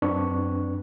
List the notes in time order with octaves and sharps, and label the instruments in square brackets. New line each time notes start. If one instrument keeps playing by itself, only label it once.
[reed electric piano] F#2 C4 D4 B4 C#6